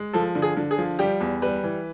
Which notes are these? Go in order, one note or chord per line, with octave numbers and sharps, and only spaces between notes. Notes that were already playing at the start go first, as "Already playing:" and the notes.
Already playing: G#3
F3 A4
D3
G#4
D3
G#4
F3
G3 G4
E2
G3 B4
E3